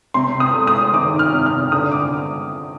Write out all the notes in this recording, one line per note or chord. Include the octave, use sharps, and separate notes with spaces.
C3 C6
D#6
A3
D#6
D#3 D6
F6
C3
F6
D3 D#6
D6